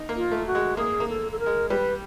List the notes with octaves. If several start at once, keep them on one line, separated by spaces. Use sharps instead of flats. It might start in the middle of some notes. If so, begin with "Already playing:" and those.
Already playing: D#4
A#3
F4
A3
F#4
G#3
A#3 G#4
A#3
A4
A4
A#4
G#3
G3 B4